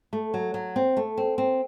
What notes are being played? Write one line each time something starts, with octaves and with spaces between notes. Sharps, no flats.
A3
F#3
F#3
C4
A3
C4
C4